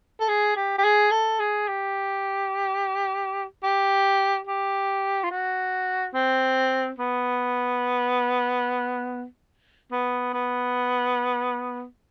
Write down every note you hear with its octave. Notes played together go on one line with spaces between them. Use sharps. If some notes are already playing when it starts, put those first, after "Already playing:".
A4
G#4
G4
G4
G#4
A4
G#4
G4
G4
G4
F4
F#4
C4
B3
B3
B3